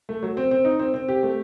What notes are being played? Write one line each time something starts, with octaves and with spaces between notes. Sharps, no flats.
A3
F#3
C4
C4
D#4
C4
C4
G4
A3